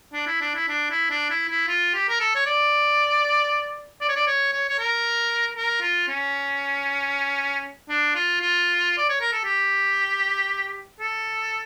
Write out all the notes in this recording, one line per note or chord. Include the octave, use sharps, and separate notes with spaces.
D4
E4
D4
E4
D4
E4
D4
E4
E4
F4
G4
A#4
A4
C#5
D5
D5
C#5
D5
C#5
C#5
C#5
A#4
A#4
F4
C#4
D4
F4
F4
D5
C#5
A#4
A4
G4
A4